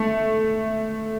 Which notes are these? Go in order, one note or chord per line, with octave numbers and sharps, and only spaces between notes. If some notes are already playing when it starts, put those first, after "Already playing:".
Already playing: A3